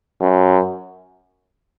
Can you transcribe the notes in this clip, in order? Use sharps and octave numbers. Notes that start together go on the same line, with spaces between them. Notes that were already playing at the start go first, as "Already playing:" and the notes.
F#2